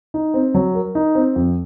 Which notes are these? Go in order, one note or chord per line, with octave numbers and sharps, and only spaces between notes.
D#4
C4
F#3
A#4
D#4
C4
F2